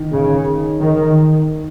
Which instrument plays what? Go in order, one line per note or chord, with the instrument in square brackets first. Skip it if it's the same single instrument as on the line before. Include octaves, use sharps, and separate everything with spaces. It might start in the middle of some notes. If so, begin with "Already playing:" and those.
Already playing: [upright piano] D#3
[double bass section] C#3
D#3